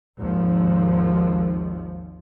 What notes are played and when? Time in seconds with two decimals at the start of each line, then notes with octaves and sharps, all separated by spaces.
0.19 G#1 D#2 F3